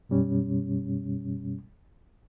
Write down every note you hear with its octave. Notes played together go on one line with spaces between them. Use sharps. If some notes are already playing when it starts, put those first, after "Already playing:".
F#2 B2 G3 C#4